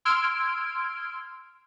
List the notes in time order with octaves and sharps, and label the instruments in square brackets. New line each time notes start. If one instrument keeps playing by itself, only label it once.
[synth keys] C6 E6 F6 G#6 D7